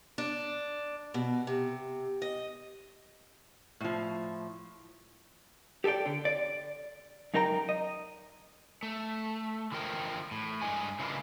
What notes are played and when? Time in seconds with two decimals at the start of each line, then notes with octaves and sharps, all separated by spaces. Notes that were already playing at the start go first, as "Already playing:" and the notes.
0.18 D4
1.14 B2
1.47 C3
2.22 D#5
3.81 A2 F3
5.84 G4 A4 C5 D5 G5
6.06 D3
6.25 D5
7.34 F#2 D#4 A#4 G5 A#5
7.69 D#5
8.83 A3
9.72 D3 E3 F3 A#4 G5
10.31 A2
10.62 G2 G#3 G#5
10.99 C#3 E3 G#3 A#3 D4 F4